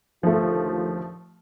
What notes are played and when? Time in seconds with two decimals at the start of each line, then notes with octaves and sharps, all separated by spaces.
0.23 D#2 D3 F3 A3 F4